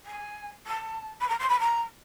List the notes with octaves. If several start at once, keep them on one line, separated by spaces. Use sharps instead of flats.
G#5
A5
B5
A#5
C6
B5
A#5